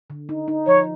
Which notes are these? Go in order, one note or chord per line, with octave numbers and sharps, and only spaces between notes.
D3
D#4
D#4
F3 C#5